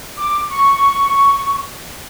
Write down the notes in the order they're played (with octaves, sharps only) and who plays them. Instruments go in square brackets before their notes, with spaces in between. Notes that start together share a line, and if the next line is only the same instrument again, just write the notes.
[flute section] D6
C#6